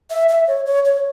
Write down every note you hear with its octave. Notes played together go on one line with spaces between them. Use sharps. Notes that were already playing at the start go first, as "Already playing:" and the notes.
E5
E5
C#5
C#5
C#5